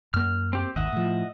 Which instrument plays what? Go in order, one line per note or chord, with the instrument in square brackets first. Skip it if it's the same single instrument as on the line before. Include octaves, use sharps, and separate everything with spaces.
[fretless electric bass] F#2 A#3 [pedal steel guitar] F6
[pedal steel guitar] C4 G4
[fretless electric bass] G#1 D#2 [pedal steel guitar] D#5 E5 F#5
[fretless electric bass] A2 F3